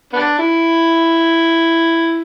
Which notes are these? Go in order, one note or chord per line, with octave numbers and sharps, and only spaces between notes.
B3 D4
E4